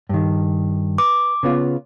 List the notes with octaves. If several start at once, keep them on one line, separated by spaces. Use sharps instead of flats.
G2 D#3
B4 D6
C#3 B3 F4